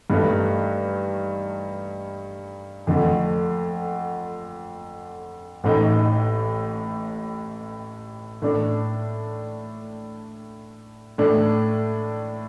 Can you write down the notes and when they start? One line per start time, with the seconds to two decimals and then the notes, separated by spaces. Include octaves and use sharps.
0.10 G2 D#3 A3 D#4
2.87 F2 D3 A3
5.64 A1 A2 A3 D#4
8.42 A2 A3 D4
11.18 A2 A3 D4